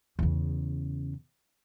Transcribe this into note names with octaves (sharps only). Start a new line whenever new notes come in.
E2 C#3